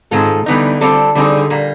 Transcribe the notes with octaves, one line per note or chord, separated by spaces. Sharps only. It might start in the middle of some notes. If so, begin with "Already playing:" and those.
G#2 D#3 G#3 C4 F4 A4
D3 E3 G3 B3 D#4
G3 C4 F4 A4
D3 G3 C4 D#4 G#4
A#2 G3 A#3